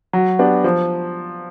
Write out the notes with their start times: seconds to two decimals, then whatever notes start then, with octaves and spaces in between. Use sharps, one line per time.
0.13 F#3
0.39 B3 D4 G4
0.64 F3